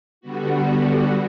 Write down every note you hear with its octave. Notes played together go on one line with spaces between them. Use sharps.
D3 G3 B3 F#4